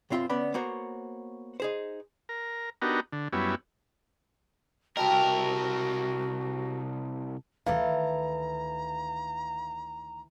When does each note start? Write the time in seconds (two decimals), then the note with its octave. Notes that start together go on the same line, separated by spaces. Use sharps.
0.10 B1 F#2 C4 F4 E5 C6
0.29 D2 B3 C#4 D5 B5
0.54 A#3 B3 F#4 C5 C#5
1.60 D#4 G#4 C5
2.29 A#4
2.82 B3 D4 D#4 F#4 G4 A#4
3.12 D3
3.33 F#2 G3 B3 C#4 E4
4.97 C2 F#4 G4 A#4 B4 D#5 E5 A5
7.66 D2 D#3 E3 A4 F5 A#5